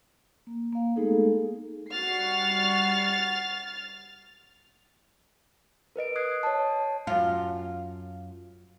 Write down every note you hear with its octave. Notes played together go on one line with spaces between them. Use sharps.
A#3
A#3 F5
G#3 A3 B3 D#4 G#4 A4
G3 F#4 F6 A6 C7
A#4 B4 D#5 D7
D#6 F#6 G#6 C7
C#5 A5
F#2 F4